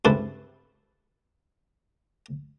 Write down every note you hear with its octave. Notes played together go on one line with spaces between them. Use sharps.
C#2 G2 C4 E4 A4 B4